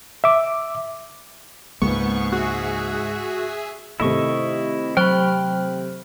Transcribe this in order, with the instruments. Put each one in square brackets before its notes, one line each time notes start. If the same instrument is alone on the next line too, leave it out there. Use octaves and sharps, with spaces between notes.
[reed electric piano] E5 D6
[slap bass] C#2 G#3 A#3 [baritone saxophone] G#2 [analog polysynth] B3 [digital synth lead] C#6
[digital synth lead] F#4 [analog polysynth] G#4 E5
[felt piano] C3 A3 [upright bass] D#3 [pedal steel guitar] E4 D#5 C#6
[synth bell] F#3 C5 F6 [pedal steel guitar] G5 B5